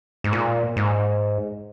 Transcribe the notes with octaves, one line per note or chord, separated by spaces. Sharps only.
G#2
A#2
G#2